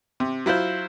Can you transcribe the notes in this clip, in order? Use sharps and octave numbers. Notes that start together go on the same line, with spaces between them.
C3
F#3 E4 F4 C5